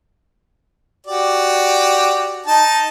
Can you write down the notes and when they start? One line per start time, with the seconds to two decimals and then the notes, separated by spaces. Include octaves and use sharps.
1.07 F#4 G4 D5
2.46 D#4 A5